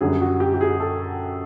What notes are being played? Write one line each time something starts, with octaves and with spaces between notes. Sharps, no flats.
F#2 D3 G3 G#4
F#4
G4
G4
G#4
A4